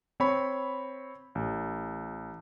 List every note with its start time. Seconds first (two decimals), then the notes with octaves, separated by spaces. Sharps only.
0.20 C4 C#5 B5 C#6
1.35 A1